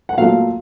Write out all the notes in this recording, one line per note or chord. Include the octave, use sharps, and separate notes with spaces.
F#5
A#2 F#3 A3 F5